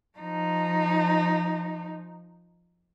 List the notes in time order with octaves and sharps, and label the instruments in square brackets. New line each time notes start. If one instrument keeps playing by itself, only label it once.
[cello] F3 D#4